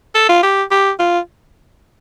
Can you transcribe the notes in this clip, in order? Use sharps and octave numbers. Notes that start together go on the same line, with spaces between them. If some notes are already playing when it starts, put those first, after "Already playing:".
A4
F4
G4
G4
F4